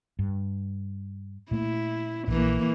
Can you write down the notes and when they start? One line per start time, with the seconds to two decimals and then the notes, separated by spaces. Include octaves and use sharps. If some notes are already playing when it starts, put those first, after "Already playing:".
0.19 G2
1.51 A#2 A3 A#3 E4
2.28 A#1 A#2 E3 A#3